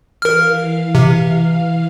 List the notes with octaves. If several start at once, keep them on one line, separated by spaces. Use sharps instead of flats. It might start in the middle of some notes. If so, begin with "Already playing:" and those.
E3 A#4 F5 F6
C3